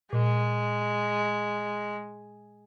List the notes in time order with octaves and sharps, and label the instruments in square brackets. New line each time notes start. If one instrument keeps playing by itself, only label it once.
[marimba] A#2 [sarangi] G#3